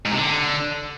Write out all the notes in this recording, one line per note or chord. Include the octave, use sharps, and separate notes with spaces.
G#2
C3
D3